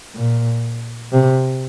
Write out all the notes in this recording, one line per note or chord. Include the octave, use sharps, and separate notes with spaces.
A#2
C3